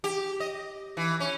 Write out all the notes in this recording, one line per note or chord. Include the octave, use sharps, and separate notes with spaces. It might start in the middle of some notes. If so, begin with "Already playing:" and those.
G4
D#5
E3
C#4